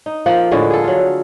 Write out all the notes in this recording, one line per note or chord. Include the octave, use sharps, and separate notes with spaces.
D#4
F3 A#3 F#5
A2 D3 G#3 A#3
G#4 A4
F#3 F4